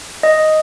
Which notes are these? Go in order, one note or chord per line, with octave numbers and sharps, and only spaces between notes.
D#5